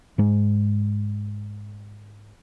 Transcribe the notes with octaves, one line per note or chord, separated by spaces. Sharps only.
G#2 G#3